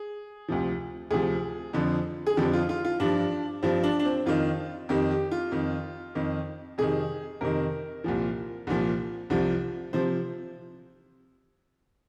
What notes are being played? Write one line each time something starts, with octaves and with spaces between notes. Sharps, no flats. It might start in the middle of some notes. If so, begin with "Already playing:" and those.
Already playing: G#4
D2 C3 F3
D2 C3 F3 G#4
F2 D3 F3
G#4
F2 D3 F3 G4
F4
F4
F4
G2 F3 D4
G2 F3 C4
D4
D4
C4
F2 D#3 F4
F2 D#3 G4
G4
F4
F2 D#3
F2 D#3
F2 C3 D#3 G#4
F2 C3 D#3 A#4
C2 A#2 F3
C2 A#2 F3
C2 C3 F3
C3 F3 C5